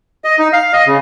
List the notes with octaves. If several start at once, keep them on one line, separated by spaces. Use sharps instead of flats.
D#5
D#4
F5
D#5
C#3